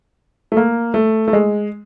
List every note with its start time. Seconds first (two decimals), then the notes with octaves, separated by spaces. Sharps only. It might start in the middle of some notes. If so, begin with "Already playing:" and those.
0.52 A3
0.57 A#3
0.94 A3
1.28 A3
1.33 G#3